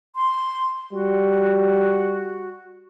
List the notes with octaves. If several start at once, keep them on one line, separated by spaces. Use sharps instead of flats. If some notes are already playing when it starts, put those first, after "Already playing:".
C6
G3 F#4